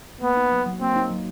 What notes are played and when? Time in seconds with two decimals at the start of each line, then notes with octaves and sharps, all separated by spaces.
0.21 A#3 B3
0.37 D#4
0.52 F#3
0.66 F#3
0.81 A#3 C4
0.96 D#4
1.11 F#3